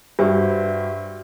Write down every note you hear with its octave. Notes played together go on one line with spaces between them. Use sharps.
G2 F#4 C5 E5